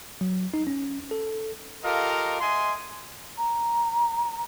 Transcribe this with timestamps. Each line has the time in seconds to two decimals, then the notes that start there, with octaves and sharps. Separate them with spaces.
0.21 F#3
0.54 D#4
0.67 C#4
1.11 A4
1.84 F4 G4 A4 A#4 D#5 F5
2.41 D#5 E5 F#5 G#5 C6
3.38 A#5